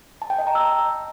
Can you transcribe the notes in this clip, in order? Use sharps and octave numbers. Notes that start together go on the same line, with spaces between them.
A5
G5
D#5
A#5
E6